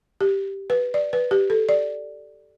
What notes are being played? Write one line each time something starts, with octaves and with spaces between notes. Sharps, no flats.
G4
B4
D5
B4
G4
A4
D5